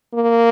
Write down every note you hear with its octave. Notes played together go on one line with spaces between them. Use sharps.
A#3